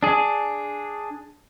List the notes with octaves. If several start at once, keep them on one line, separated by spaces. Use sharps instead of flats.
D4 G#4